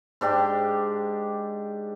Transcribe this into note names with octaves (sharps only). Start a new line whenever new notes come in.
G#2 D4 G4